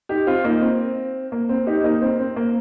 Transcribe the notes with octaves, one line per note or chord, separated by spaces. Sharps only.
D#4 G4
C4 F4
A#3 D#4
C4
A#3
C4
D#4 G4
A#3 D#4
C4
C4
A#3